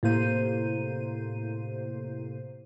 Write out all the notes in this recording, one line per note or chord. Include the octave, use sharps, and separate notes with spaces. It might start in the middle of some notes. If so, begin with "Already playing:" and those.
A2 C3 A#3 C5 D#7